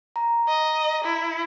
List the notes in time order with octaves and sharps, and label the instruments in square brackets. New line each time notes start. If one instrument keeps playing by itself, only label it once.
[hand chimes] A#5
[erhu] D#5
E4